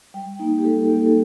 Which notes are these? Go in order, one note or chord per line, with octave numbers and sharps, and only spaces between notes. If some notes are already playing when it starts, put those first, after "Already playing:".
G3 G5
A#3 D#4
G4
G3 A4
A#3 D#4 G4
A4